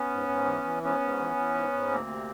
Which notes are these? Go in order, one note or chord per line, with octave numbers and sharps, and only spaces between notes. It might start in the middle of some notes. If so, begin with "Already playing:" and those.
Already playing: B3 C#4
G#2
G#2
E3
E3
G#2 B3 C#4
G#2
E3
E3
G#2
G#2
D2 A#3 C4
C3